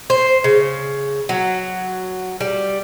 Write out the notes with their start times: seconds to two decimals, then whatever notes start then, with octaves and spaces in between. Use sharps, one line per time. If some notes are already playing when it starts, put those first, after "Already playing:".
0.10 C5
0.44 C#3
1.29 F#3
2.41 G3